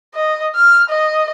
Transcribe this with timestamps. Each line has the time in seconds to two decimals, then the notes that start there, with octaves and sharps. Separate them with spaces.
0.14 D#5
0.56 F6
0.89 D#5